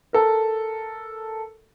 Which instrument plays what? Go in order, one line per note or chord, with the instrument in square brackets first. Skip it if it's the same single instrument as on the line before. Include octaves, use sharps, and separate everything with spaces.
[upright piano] A4 A#4